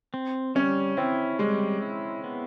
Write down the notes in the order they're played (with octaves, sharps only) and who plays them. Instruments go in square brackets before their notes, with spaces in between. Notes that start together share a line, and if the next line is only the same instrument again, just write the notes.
[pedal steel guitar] C4
[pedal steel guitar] G3 [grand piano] C#4
[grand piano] C4 [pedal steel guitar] E4
[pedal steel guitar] G3 [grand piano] G#3
[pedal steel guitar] E4
B3